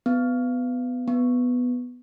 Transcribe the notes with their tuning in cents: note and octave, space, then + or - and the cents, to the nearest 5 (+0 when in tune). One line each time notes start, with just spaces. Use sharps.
B3 +15
B3 +5